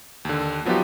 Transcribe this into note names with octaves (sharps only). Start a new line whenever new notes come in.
D#2 D3
F3 F#3 B3 D#4 F4 G4